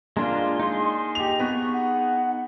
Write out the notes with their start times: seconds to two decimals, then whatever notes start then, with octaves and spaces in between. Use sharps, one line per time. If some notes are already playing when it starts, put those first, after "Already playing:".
0.17 G#3 A#3 D4 F4 C6
0.60 D#4 G#4
1.15 G4 F7
1.40 B3 C#6
1.73 F#5